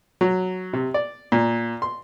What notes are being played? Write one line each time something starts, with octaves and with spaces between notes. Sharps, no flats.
F#3
C3
D5
A#2
C6